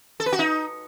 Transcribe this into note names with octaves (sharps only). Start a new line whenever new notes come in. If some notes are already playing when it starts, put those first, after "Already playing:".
A4
B4
F#4
D#4